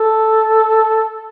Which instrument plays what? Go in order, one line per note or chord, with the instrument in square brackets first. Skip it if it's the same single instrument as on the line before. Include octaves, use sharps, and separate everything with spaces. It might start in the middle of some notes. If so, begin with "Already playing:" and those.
Already playing: [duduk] A4